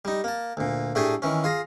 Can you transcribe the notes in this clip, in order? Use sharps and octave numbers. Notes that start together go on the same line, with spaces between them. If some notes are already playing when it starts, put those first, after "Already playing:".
G3 D#4
A#3 A5
D2 A#2
A2 A3 D4 G4 G#4 G#5
D#3 E3 C#4
F4 G#4 A#5